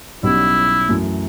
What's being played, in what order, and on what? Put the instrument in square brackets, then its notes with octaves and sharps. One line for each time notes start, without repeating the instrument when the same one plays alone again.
[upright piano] B1 B2 G3 C#4 [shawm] E4
[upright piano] F#2 E3 A3